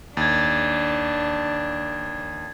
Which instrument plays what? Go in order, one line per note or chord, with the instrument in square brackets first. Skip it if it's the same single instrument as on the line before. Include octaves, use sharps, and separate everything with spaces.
[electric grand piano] D#2 [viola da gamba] D4 [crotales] G#6 A6